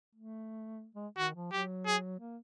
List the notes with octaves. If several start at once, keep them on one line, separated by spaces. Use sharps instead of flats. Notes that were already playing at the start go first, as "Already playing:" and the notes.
A3
G#3
D#3 F#4
F3
F#3 G4
G#4
A#3